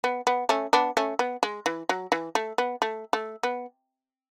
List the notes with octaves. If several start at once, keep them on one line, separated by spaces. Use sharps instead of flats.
B3
B3
A3 C#4
B3 D4
A3 C#4
B3
G#3
E3
F#3
E3
A3
B3
A3
A3
B3